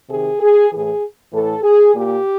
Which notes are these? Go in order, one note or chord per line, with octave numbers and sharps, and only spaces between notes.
C3 D#3 G#4
G#4
A2 E3 G#4
A2 E3 A4
G#4
A#2 G4